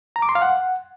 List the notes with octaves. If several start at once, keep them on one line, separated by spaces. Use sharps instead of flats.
A#5
D6
C6
F5
F#5